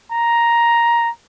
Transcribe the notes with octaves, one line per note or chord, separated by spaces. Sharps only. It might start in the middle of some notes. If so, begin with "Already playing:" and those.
A#5